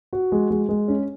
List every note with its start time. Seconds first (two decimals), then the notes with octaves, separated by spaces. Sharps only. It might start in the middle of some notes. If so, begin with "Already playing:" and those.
0.13 F#4
0.32 G#3
0.50 G#3
0.69 G#3
0.88 C#4